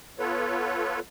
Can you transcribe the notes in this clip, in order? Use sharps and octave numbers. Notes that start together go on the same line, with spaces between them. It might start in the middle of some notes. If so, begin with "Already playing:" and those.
B3 F4 A4 B4 C#5